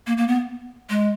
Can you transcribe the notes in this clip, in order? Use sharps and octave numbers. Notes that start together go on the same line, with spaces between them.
A#3
A#3
B3
G#3